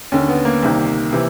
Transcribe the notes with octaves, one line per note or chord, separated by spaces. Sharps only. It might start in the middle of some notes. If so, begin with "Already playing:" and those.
D#2 D3 C#4
B3
A#3
C2 C3 D#3
C3 E3